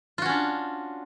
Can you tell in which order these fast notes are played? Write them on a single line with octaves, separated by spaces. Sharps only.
F4 F#4 C#4 D4